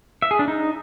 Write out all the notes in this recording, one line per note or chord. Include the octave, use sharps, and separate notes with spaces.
E5
G#4
D4
D#4